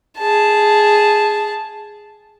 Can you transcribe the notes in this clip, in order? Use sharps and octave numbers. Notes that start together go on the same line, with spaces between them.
G#4 A5